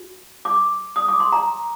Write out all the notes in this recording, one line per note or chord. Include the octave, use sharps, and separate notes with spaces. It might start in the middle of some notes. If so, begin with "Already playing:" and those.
Already playing: F#4
D6
D#6
D6
C6
A#5